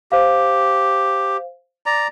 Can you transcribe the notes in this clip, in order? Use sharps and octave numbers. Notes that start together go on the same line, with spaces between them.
G4 C5 F5
D5 A#5